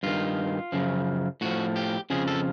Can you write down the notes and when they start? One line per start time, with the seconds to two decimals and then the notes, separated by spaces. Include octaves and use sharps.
0.03 G2 D#3 F4
0.72 F#2 C#3 F3
1.41 A2 F3 F#4
1.76 G4
2.10 F2 C#3 F3 G#4
2.28 A4